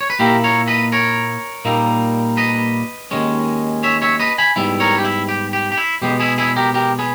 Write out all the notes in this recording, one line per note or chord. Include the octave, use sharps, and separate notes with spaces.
C#5
B4
A#2 A#3 E4 G4 A#4
A#4 C#5
B4 D#5
A#4 C#5
A#2 G3 A#3 D#4
B4 D#5
D#2 D#3 G#3 C#4
C#5 E5
C#5 E5
B4 D#5
G#5 B5
G#2 G3 B3 E4
A#4 C#5
G4
E4
G4
G4
G4
E4
B2 G#3 B3 G4
E4 G#4
E4 G#4
G4 A#4
G4 A#4
G#4 B4